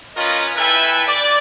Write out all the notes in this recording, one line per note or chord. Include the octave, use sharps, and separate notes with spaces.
C#4 F4 A#4 B4 D#5
E4 A4 B4 E5 G5 G#5
D5